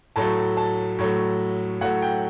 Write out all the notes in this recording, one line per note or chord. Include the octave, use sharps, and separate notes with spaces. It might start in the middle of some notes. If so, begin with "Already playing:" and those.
A2 F#3 A3 A5
A5
A2 F#3 A3
A2 F#3 A3 F#5
G5